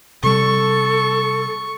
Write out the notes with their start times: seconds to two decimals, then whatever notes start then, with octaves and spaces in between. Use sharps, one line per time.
0.23 C3 G3 A4 C#6